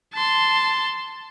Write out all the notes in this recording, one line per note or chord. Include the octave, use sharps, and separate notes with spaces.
A5 C6